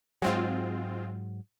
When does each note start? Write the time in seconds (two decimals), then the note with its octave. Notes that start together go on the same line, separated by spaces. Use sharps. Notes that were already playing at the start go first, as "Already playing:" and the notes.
0.22 G#2 F#3 G#3 C4 F4